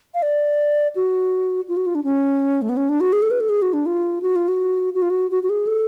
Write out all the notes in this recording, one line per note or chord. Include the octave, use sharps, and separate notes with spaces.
F5
D5
F#4
F4
F#4
F4
D4
C#4
A3
B3
C#4
D4
F#4
G#4
A4
B4
A4
G#4
F#4
D4
F4
F#4
F4
F#4
F#4
F4
F#4
F#4
F#4
G#4
A4